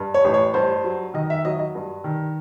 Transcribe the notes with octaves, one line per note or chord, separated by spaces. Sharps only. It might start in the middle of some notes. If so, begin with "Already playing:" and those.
Already playing: G2
C#5
A1
C#5
G2 C5
F#3
D#3 D#5
E5
F#3 D#5
D#5
G2
D#3